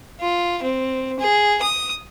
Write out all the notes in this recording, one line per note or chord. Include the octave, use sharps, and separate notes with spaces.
F4
C4
G#4
D#6